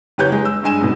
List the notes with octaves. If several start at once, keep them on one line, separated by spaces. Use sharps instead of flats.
F#1 G4 B4 C#5 G6
G#3
E6
G2 G#3 G#5 E7
G#2 B2